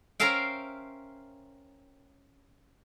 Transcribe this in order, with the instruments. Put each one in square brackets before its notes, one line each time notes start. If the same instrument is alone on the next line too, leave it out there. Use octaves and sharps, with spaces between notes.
[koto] C#4 A#4 C5 E5 F5 G5